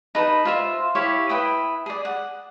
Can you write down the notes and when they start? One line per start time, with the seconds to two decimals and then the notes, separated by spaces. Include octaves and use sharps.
0.15 D#4 B4 F#5 A5
0.45 F4 C5 E5
0.95 E4 G4 C#5 F5
1.29 E4 B4 G5 D#6
1.86 G#4 D5
2.05 F#5